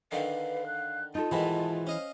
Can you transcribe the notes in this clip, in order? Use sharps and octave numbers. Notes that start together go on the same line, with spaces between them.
D3 D#3 B4 F5
F#6
D#4 F4 A4 A5
G#2 B2 D#3 E3 E4
C#4 C5 D#5 F5